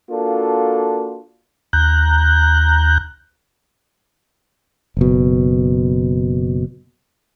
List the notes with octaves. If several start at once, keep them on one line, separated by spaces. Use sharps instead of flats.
A#3 D4 F4 F#4 A4
D#2 A#5 F#6 G6
F#1 B2